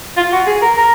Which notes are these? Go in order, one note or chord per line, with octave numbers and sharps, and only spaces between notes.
F4
F#4
G#4
A#4
A#4